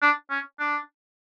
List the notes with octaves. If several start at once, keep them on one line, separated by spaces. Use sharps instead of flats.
D4
C#4
D4